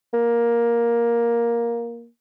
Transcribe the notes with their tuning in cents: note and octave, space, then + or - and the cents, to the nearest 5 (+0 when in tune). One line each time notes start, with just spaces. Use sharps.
A#3 +10